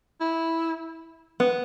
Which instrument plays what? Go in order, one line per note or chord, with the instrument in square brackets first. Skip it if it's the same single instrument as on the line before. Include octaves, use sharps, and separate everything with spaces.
[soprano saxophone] E4
[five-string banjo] B3